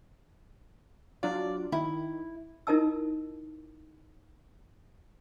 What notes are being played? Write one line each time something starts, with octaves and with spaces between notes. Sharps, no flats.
F#3 D4 F4 D5
D#3 E4
D#4 E4 A#4 D#5 A5 E6